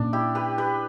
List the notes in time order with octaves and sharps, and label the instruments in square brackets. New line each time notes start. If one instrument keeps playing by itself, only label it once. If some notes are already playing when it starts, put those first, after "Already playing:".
Already playing: [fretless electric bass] A#2 A#3 C#4 [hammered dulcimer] D4
[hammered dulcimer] E4 G4
G4 B4
G4 B4